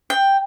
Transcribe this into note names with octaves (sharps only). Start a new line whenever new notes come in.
G5